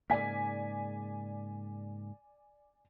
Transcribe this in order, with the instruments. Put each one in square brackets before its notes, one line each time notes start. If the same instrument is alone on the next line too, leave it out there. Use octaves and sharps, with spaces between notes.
[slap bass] G#2 C#3 A#3 [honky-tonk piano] D5 G#5 B6